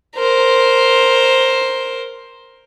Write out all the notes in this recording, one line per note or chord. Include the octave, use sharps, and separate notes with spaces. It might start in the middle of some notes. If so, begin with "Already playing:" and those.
A#4 C5